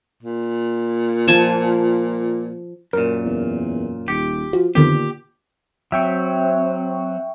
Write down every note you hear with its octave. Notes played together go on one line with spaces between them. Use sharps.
A#2
F3 G#5 A5
F#2 A#2 A#4
E2
D#1 G4 C#7
F3 F#4
F2 D3 D#3 B3 G4
A#2
F#3 C4 E5 G5 C#6